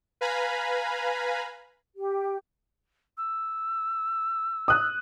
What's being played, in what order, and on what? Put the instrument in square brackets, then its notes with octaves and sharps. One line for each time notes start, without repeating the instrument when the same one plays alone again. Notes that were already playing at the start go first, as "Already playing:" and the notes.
[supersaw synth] B4 F5 G#5 A#5 B5
[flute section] G4
[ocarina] E6
[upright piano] D#6 F#6